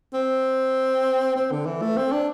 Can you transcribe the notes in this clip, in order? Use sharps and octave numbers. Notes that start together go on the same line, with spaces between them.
C4
C4
D3
E3
A3
C4
D4